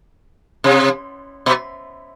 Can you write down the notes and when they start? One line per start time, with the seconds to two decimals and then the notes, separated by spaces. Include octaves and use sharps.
0.64 C3
1.46 B2